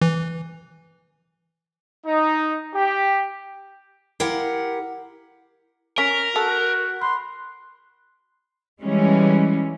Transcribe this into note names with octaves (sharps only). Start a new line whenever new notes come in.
E3
D#4
G4
E4 G4 A#4 F5 F#5
C#4 A#4 F6 B6 F7
F#4 A4
B5 C6 F#6
E3 G3 G#3 C#4